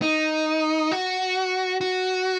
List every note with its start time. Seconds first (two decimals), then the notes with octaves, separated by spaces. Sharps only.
0.02 D#4
0.91 F#4
1.81 F#4